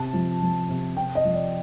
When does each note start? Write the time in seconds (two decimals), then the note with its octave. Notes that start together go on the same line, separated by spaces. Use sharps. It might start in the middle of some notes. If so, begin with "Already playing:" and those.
Already playing: C3 A5
0.13 F3
0.42 F3
0.69 C3
0.97 C3 G5
1.15 D#5
1.25 F3
1.34 D5